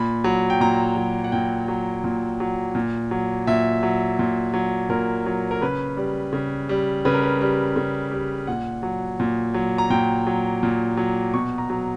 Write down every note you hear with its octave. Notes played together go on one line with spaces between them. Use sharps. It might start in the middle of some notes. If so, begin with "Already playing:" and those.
Already playing: A#2 B5
F#3
G5
A#2 A#5
F#3
F#5
A#2 G5
F#3
A#2
F#3
A#2
F#3
A#2 E5
F#3
A#2
F#3
A#2 A#4
F#3
A#4
C#3 B4
G3
C#3
G3
C#3 B4
A#4
B4
G3
C#3
G3
A#2 F#5
F#3
A#2
F#3
A#5
A#2 G5
F#3
A#2
F#3
B2 C#6
A#5
F#3